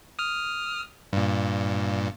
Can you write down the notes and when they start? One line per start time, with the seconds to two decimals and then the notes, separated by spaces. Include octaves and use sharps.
0.19 D#6 F6
1.13 G2 A#2